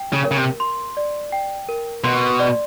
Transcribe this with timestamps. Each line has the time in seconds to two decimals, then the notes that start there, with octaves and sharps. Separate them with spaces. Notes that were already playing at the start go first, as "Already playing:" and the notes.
Already playing: G5
0.13 C#3
0.24 A#4
0.31 C#3
0.37 C3
0.60 C6
0.97 D5
1.32 G5
1.69 A#4
2.04 B2 C6
2.39 D5